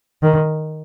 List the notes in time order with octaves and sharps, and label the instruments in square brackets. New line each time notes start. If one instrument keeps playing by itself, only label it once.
[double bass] D#3